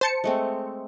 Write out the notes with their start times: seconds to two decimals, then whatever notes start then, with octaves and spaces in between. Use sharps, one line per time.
0.01 C5 A5 C#7
0.24 G#3 A3 C4